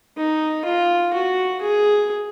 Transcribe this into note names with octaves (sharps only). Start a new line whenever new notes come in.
D#4
F4
F#4
G#4